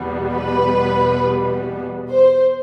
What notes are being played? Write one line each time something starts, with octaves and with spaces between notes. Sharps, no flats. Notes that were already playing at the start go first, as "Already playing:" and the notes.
Already playing: E2 B2 G3 B3
B4
C5